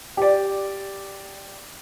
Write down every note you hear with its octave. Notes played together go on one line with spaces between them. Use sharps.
G4 D5